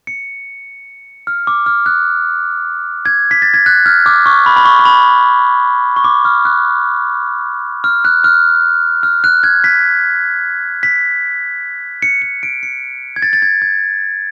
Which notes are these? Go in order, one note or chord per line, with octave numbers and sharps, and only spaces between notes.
C#7
F6
D6
F6
F#6
G#6
B6
A6
G#6
F#6
F6
D6
C#6
B5
B5
C#6
C#6
B5
C#6
D6
F6
F#6
F6
F#6
F6
F6
F#6
G#6
B6
B6
C#7
C#7
D7
C#7
G#6
A6
A6
G#6
G#6